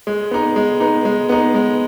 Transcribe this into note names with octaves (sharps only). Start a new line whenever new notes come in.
G#3
B3 D#4
G#3
B3 D#4
G#3
B3 D#4
G#3